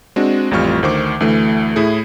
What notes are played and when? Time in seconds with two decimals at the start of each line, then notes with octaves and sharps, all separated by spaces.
0.16 G#3 C4 D4 F#4
0.51 A1 F2 G3 F4 C#6 F6
0.83 D2 D#3 C5 C#6 D6
1.20 D2 E3 A3
1.76 A2 E4 G#4